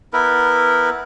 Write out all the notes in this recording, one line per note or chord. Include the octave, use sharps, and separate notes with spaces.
B3 E4 A#4 B4